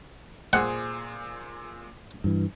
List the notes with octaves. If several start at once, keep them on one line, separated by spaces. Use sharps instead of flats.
A#2 G#4 C5 F#5
G2 E3